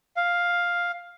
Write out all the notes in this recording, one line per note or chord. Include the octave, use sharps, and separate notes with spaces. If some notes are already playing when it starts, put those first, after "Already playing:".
F5